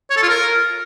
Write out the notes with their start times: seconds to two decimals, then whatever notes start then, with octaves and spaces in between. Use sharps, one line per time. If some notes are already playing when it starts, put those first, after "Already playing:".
0.11 C#5
0.17 A4
0.23 F4
0.29 A#4